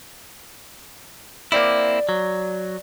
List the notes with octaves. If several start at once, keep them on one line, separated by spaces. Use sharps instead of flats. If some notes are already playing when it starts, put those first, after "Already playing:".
A#3 C4 E4 D5
F#3